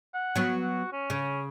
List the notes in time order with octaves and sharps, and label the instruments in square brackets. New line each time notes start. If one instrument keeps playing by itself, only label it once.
[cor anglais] F#5
[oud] F#3 B3
[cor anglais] F#4
C#4
[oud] C#3